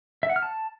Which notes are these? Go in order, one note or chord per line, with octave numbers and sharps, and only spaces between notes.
E5
F#5
F6
A5